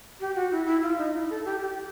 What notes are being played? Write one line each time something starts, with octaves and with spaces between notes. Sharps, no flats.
G4
F#4
E4
E4
F4
D#4
E4
A4
G4
G4